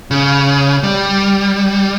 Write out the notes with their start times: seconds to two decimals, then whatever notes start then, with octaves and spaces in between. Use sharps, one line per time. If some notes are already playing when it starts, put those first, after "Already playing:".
0.11 C#3
0.83 G3